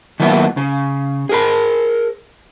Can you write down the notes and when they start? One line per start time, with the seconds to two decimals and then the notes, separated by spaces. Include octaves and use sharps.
0.20 D#3 F#3 A#3 B3 E4
0.57 C#3
1.29 G#4 A#4 B5